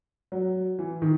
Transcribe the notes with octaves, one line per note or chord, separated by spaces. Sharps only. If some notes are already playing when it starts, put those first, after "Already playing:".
F#3
E3
D#3